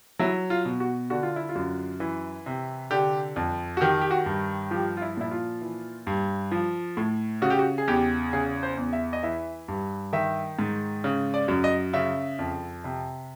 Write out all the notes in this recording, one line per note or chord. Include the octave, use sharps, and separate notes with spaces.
F#3 E4
F4
B2
F#4
D3 F#4
F4
E4
F4
F#2
E3
C3
D3 G4
F2
F#4
D#3 G4
G4
F#4
G2
F3 G4
F4
E4
A#2 E4
F4
E3
G2
F3
A2
C#3 F#4
G4
F#4
G#4
E2 G4
C#3 G#4
C5
E2
E5
D#5
E3 E5
G2
D#3 E5
G#2
C#3
D5
F#2
D#5
C#3 E5
F2
C3